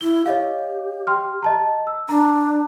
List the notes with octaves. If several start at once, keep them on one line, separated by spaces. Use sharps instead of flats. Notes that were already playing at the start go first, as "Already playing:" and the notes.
E4 G7
G4 C#5 D#5 F5
G5 C6 F6
D#5 A5 A#5
E6
D4 A#5